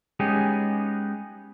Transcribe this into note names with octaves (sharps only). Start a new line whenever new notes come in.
G#3 B3 C#4 D#4 G4 G#4